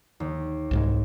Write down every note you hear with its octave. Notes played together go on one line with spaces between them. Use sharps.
D#2
C2 G#2 G#3